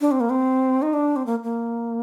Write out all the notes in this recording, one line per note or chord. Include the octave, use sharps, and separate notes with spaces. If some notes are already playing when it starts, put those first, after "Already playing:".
D4
C4
A#3
C4
D#4
D4
C4
A#3
A#3